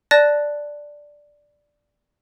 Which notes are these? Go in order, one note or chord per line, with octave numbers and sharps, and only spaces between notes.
D5 A5 F#6 A6 A#6